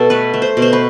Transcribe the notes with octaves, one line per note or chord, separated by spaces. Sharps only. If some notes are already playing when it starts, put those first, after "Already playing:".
Already playing: B2 A4
A3 B4
A3
C5
B2
C5
B4